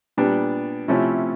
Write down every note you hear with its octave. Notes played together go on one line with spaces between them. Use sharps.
A#2 G3 B3 D4
C3 F3 A3 C#4 E4